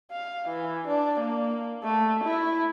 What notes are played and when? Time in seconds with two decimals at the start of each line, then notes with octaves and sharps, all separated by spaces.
0.11 F5
0.49 E3
0.88 D4
1.20 A#3
1.84 A3
2.24 E4